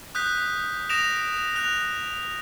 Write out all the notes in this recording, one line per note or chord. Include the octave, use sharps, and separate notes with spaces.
D#6 F#6 G6 B6
D#6 A#6 D7 E7 F7
F#6 F7